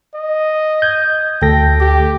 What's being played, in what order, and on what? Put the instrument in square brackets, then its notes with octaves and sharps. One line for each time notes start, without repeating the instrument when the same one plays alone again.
[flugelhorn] D#5
[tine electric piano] G6 G#6
[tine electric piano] D2 A4 A#6 [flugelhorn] G5
[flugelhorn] G4